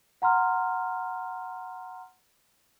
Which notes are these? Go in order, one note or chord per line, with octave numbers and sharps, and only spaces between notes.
F#5 A#5 C6 F6